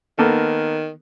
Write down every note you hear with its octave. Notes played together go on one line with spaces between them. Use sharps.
D#3 A#3 B3 A4